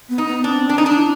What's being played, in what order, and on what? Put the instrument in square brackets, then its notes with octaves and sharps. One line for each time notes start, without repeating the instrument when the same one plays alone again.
[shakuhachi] B3
[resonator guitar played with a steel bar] D#4
[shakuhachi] B3
[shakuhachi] C4 [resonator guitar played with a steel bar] D4
[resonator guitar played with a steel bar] D4
D#4
D4
[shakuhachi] E4